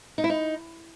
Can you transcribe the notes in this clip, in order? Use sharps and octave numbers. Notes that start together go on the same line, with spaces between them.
D#4
E4
D#4